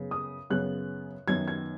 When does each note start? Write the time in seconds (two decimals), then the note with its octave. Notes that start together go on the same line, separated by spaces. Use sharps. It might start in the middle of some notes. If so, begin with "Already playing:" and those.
Already playing: F#2 C#3 B3
0.11 D#6
0.50 F#2 C#3 B3 F#6
1.28 F#2 D#3 B3 G#6
1.48 G#6